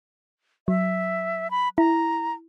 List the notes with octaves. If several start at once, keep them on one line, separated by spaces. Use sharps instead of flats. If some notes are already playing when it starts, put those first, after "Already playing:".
F#3 E5
B5
E4 A#5